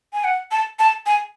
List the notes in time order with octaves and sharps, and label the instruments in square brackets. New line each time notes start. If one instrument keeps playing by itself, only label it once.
[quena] G#5
F#5
A5
A5
G#5